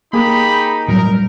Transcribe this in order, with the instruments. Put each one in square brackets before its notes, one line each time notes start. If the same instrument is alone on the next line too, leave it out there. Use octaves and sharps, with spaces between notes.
[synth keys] A#3 G#4 [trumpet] D#4 [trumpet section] G4 B5
[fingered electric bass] A2 F#3 G3 [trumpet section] A#4